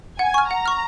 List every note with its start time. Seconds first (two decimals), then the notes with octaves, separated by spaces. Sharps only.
0.19 F#5 G#5
0.34 C#6 F6
0.50 F#5 A#5
0.66 C#6 F6